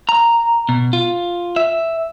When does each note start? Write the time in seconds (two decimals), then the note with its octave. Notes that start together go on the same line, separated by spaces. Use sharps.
0.09 A#5
0.69 B2
0.93 F4
1.56 E5